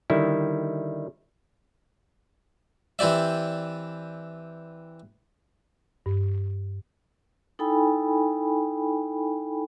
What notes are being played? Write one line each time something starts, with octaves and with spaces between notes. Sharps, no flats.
D3 D#3 G3 E4
E3 C4 G4 D5 E5
G2
D#4 E4 A4 G5 G#5 B5